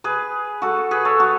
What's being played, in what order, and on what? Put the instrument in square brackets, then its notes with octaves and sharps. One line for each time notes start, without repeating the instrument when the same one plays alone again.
[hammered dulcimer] G#4 B4
F#4 A4
G#4 B4
A4 C#5
F#4 A4